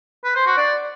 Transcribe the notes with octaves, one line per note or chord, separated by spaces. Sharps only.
B4
C5
F#4
D5